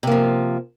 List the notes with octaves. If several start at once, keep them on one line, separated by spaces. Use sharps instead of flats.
C3 F3 A#3